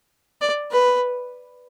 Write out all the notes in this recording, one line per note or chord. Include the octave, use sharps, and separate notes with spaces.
D5
B4